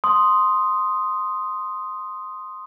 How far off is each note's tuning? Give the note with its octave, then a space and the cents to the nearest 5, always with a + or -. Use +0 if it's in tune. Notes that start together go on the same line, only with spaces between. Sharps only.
C6 +0 D#6 +0